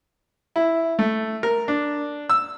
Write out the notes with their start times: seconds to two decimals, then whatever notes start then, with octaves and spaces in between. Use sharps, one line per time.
0.56 E4
0.99 A3
1.43 A#4
1.68 D4
2.30 E6